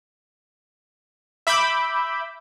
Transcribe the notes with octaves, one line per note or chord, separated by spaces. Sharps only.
E5 B5 D6 E6 G6